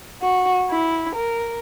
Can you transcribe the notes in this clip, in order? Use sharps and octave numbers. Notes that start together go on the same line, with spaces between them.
F#4
E4
A#4